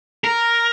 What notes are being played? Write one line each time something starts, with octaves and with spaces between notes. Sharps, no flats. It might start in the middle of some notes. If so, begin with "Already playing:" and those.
A#4